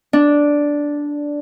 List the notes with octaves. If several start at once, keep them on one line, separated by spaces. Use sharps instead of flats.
D4